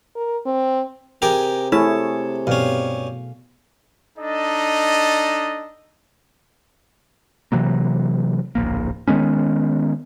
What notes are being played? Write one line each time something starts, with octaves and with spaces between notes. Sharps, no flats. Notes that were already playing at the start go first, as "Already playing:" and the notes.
A#4
C4
C3 G4 G#4 A#4
A3 E4 G#4 C#5 A5
G2 B2 C#4 F5
D4 D#4 A4 D#5
C3 E3 F#3 A#3
D1 A#1 A#3
D#3 G#3 B3 C#4